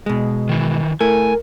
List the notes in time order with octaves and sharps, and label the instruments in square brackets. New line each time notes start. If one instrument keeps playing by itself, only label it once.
[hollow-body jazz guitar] B2 G#3
[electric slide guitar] D#3 E3
[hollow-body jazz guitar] A3 E4 [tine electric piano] A#4 [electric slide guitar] G#5